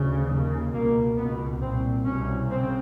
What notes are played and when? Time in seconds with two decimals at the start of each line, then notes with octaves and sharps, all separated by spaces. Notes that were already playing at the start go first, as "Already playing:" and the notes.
Already playing: D2 C#3
0.27 D#2 C#3
0.72 C#2 B2 A#3
1.17 C#2 B2 B3
1.61 C2 A#2 C4
2.06 C2 B2 C#4
2.50 C#3 C4